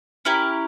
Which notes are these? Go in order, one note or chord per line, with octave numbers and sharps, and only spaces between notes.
C#4 E4 G4 A#4